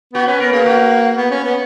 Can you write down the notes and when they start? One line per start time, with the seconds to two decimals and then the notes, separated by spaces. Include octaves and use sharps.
0.14 B3 F#4
0.27 C#4 B4
0.40 B3 A#4
0.52 A#3 G#4
0.66 F#4
1.17 B3
1.31 C#4
1.44 B3